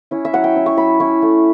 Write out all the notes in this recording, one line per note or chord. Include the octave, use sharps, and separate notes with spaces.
C#4 E4
E5
F#3 F#5
G5
C#4 E4
C#6
F#3 B5
C#4 E4 C#6
A3